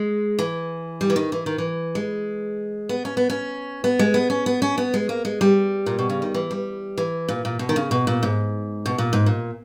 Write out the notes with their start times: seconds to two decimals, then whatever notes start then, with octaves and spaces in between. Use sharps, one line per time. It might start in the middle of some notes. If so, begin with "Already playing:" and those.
Already playing: G#3
0.39 E3
1.01 G3
1.10 E3
1.16 D#3
1.32 E3
1.46 D#3
1.58 E3
1.95 G#3
2.89 B3
3.05 C#4
3.17 B3
3.30 C#4
3.84 B3
3.99 G#3
4.14 B3
4.30 C#4
4.46 B3
4.62 C#4
4.78 B3
4.94 G#3
5.09 A#3
5.25 G#3
5.41 G3
5.86 A#2
5.99 B2
6.10 C#3
6.22 D#3
6.34 E3
6.51 G3
6.98 E3
7.29 A#2
7.45 A#2
7.59 B2
7.69 D#3
7.76 C#3
7.91 B2
8.07 A#2
8.23 G#2
8.86 B2
8.98 A#2
9.13 G#2
9.26 A#2